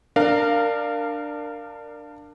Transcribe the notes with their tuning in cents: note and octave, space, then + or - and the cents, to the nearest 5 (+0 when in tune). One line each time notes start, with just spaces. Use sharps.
D4 +15 A#4 -15 F5 +0